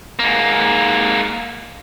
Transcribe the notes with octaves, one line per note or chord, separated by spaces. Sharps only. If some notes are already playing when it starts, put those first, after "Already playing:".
G#2 A#3